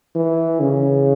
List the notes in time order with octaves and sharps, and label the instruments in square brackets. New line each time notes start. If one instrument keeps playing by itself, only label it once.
[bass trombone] E3
C#3